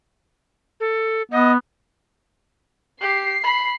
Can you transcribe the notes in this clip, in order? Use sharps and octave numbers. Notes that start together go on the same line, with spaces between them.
A4
B3 D#5
G4 C7
B5